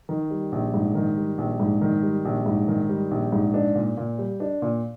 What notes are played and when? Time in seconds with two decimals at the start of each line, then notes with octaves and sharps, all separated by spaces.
0.09 D#3
0.31 G3
0.52 A#1
0.74 G#2
0.95 D#3
1.17 G3
1.38 A#1
1.60 G#2
1.81 D#3
2.03 G3
2.25 A#1
2.46 G#2
2.68 D#3
2.89 G3
3.11 A#1
3.32 G#2
3.54 D4
3.75 A#2
3.97 A#2
4.18 G3
4.40 D4
4.62 A#2